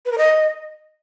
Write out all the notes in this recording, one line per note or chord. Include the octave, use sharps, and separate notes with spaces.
B4
A#4
D#5